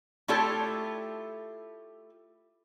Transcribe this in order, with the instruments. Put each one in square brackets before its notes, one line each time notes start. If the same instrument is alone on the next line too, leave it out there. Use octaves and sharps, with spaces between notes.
[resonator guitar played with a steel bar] A3 E4 F4 G4 A4 C#5